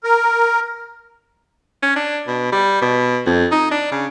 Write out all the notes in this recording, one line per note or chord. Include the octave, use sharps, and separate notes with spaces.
A#4
C#4
D4
B2
G3
B2
F2
D#4
D4
C#3